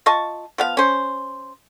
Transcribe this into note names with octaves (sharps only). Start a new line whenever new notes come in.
F4 D#5 A5 C#6
F3 B3 F5
C#4 C5